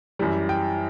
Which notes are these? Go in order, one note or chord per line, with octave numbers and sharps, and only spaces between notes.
F#2 E3 G3
G5